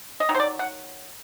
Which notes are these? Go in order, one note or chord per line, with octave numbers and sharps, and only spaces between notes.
D#5
D#3 F#3
C5
D5
F#5